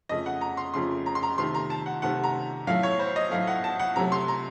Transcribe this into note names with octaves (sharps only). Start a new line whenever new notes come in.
F2 C#3 A3 D#5
F#5
A#5
C6
F2 C#3 A3 C6
A#5
C6
A#5
C3 D#3 A3 C6
A#5
A5
F#5
C3 D#3 A3 F#5
A#5
A2 F#3 A3 F5
C#5
C5
D#5
A2 F#3 A3 F5
F#5
A5
F#5
C3 F#3 A3 A#5
C6
A#5